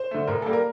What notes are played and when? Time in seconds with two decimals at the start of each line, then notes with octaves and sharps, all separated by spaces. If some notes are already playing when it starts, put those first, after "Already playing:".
Already playing: C5
0.11 D3 A3
0.27 A2 A#4
0.42 G3 A#3 A4
0.53 A#4